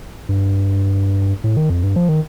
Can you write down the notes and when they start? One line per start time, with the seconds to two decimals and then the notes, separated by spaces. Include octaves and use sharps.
0.29 G2
1.44 A2
1.57 D#3
1.70 F2
1.83 G2
1.96 F3
2.09 D#3